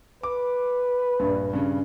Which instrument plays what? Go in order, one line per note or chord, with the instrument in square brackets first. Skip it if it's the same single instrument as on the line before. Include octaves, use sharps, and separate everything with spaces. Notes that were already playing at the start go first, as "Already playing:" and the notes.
[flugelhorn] B4 [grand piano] D6
[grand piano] A#1 G2
G2 C#3